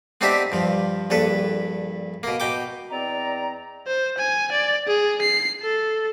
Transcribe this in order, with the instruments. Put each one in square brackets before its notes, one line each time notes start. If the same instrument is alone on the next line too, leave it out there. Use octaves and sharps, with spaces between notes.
[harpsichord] B3 C4 D4 D#4 G4 E5
G2 F3
A#1 G2 A4 B4
B2 A#3
B2 G5 D6
[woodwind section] E2 C4 D5 D#5 A#5
[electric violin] C5
G#5
D5
G#4
C7
A4